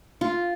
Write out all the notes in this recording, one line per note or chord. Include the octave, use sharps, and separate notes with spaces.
F4